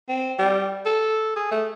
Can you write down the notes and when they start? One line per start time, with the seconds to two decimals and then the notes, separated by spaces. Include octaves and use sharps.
0.09 C4
0.39 G3
0.86 A4
1.36 G#4
1.52 A3